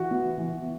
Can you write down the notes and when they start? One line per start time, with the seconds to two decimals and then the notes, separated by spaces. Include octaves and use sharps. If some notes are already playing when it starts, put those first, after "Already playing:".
Already playing: E3 F#4
0.11 B3
0.38 E3